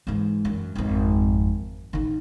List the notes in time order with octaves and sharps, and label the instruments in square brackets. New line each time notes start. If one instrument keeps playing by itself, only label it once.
[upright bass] G#2 E3
F#2
G#1 F2
A1 D#3